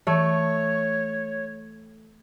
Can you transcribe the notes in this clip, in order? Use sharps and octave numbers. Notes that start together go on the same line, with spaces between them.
E3 A3 C#5